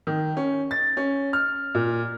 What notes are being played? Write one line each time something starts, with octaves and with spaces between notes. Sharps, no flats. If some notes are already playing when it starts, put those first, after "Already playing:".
D#3
C#4
A6
C#4
F6
A#2